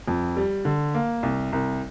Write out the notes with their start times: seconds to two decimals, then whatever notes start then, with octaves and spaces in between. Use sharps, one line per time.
0.08 F2
0.37 G3
0.65 D3
0.94 A#3
1.23 C2
1.53 C2